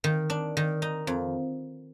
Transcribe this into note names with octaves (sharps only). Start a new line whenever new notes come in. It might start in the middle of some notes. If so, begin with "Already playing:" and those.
D#3
D4
D#3
D#4
F2